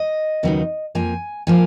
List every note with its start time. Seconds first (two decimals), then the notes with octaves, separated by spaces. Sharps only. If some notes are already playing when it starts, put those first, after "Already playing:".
Already playing: D#5
0.43 D#2 C#3 F#3 B3 D#4
0.95 F2 F3 A#3 G#5
1.47 F3 A#3 G#5